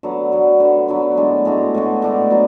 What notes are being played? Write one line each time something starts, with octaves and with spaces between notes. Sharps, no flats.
D3 F#3 B3
D3 F#3 B3
D3 F#3 B3
D3 F#3 B3
A2 G#3 D4 F#4
A2 G#3 D4 F#4
A2 G#3 D4 F#4
A2 G#3 D4 F#4
F#3 B3 D4